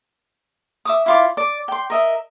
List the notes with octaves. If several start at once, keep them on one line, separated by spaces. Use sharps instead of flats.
E5 D6 D#6
E4 F4 D6
D5
G5 C6
A#4 D#5 E5